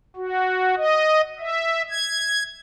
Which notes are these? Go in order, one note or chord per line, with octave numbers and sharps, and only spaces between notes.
F#4
D#5
E5
G#6